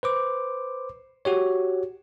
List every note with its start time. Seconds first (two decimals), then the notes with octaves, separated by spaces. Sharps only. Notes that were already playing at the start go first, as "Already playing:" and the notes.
0.03 B4 C5 D6
1.25 F#4 G4 C#5